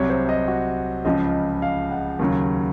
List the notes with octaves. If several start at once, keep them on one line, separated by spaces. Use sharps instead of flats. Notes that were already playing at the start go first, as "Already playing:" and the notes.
Already playing: C2 C3 F#3 C#5
C5
D#5
F#4
C#2 C#3 F3 D#5
F5
F#5
D#2 C#3 F#3